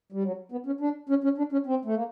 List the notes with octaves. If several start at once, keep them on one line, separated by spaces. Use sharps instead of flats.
G3
F#3
B3
C#4
D4
C#4
C#4
D4
C#4
C4
A3
A#3